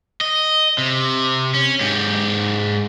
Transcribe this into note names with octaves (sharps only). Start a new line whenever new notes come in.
D#5
C3
C#4
G#2 G4